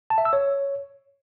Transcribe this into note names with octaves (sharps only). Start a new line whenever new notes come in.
A5
E5
E6
C#5